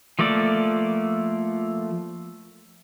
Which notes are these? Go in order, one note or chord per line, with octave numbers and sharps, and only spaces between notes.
F3 A3 A#3 D5